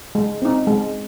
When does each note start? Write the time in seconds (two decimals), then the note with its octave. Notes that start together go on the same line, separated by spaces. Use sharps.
0.15 G#3
0.42 C4 D#4
0.67 G#3